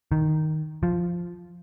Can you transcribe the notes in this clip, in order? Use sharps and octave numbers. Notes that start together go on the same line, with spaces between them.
D#3
F3